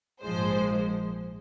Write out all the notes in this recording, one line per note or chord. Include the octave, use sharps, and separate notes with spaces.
A#1 G#2 F3 G#3 C5